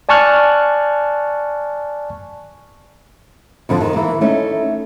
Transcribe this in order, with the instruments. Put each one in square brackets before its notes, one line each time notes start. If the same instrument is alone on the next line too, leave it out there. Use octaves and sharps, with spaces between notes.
[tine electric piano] D5 G#5 A5 C#6 F6 F#6
[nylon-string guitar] F2 D3 F3
D#3
E3 A#3
A3 C#4 D#4